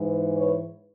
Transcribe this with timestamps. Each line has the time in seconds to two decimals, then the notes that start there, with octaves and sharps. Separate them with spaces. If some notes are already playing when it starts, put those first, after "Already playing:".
Already playing: G#2 E3
0.36 B4 C#5